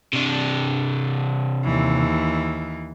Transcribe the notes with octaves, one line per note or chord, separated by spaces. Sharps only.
C3 D4
D#2 E3